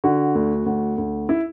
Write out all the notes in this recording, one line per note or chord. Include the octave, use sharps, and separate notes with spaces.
D3 F#4
D2
D2
D2
E4